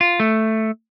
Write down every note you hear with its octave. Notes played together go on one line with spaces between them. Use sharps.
F4
A3